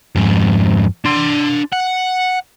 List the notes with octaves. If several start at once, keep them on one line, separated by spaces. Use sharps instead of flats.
F2 G#2
D4 C6
F#5